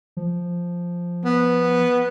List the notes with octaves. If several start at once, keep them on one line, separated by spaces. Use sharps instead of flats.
F3
B3